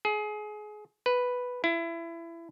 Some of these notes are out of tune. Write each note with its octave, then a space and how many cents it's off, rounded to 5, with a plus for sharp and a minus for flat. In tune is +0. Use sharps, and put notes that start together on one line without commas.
G#4 +25
B4 +0
E4 +25